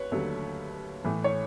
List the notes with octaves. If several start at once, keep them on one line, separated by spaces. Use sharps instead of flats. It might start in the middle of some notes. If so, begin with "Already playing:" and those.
Already playing: D#2 B4 C#5
D#2 D3 F#3 A3
A2 E3 A3
C#5